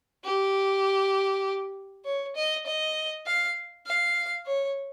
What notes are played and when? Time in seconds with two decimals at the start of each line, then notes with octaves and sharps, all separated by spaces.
0.25 G4
2.05 C#5
2.36 D#5
2.66 D#5
3.26 F5
3.86 F5
4.46 C#5